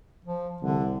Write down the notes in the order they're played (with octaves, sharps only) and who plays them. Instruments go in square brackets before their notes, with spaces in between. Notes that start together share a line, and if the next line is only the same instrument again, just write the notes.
[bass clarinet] F3
[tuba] C2 [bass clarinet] D3